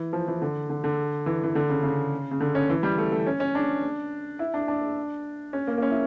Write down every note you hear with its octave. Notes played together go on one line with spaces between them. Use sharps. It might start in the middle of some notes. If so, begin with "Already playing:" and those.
Already playing: E3
F3
E3
D3
D3
D3
E3
E3
D3
C#3
C#3
C#3
D3
C#4
E3
G3
A3
A3
C#4
C#4
D4
E4
D4
D4
C#4
A#3
A#3
C#4
E4